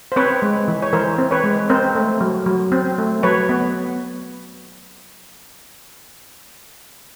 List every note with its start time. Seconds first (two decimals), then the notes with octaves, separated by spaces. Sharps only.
0.12 C5
0.16 C4 B4 C#5
0.42 G#3
0.68 E3
0.82 C#5
0.93 E3 A#4 C5
1.18 C4
1.31 B4 C#5
1.44 G#3
1.70 C4 A#4 C5
1.95 A3
2.21 F#3
2.46 F#3
2.72 C4
2.98 A3
3.23 F#3 B4 C#5
3.49 B3